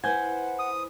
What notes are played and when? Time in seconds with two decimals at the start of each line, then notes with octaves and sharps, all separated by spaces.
0.04 E4 B4 C5 F#5 G#5 G6
0.59 D#6